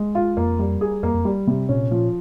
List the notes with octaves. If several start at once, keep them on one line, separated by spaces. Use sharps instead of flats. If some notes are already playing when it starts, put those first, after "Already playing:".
Already playing: G#3
F4
F2 A#3
G3
G#4
F2 A#3
F2
G3
C3
A#2 C#4
F3